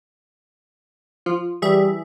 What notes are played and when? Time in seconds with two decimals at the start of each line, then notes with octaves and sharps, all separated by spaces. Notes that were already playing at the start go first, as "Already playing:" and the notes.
1.26 F3 F4
1.62 E3 G3 G#4 E5